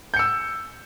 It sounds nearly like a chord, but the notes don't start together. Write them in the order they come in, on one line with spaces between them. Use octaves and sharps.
G6 C#7 E6